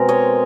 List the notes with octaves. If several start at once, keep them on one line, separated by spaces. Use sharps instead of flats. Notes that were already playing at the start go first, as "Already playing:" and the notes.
Already playing: B2 G#3 C4 A#4
C#5 D#5